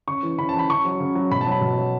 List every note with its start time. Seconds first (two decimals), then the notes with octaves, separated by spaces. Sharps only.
0.07 C#3 C#6
0.23 E3
0.38 C#3 B5
0.49 A5
0.54 E3
0.59 B5
0.69 C#3 C#6
0.85 F#3
1.00 C#3
1.15 F#3
1.31 B2 B5
1.41 A5
1.47 F#3 B5
1.61 B2
1.77 F#3